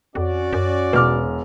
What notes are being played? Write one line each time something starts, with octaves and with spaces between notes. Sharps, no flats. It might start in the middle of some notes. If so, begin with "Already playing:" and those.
F2 C#4 F#4 D5
F#2
E1 B2 B4 D6 F6